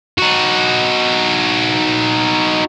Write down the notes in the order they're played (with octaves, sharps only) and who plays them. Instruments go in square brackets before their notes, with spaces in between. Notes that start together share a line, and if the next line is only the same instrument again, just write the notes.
[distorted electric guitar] D#4 F#4